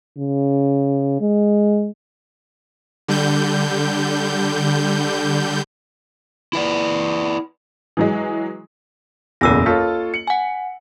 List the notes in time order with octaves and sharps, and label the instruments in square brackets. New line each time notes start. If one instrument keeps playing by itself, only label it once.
[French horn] C#3
G#3
[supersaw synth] D3 G3 G6
[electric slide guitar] E4 B4 D5
[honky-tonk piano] E3 F#3 G#3
[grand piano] F#1 B1 E2 [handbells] A#4 E6 A#6
[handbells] A#3 [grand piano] F4 A4 C#5
[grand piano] C#7 F#7
[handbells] F#5 G#5